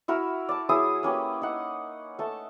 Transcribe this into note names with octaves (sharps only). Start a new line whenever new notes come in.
E4 F#4 A#4 E5
D5 A5
F#3 E4 G#4 D#6
A#3 C#4 G4 B4
D#4 F#5
A3 A5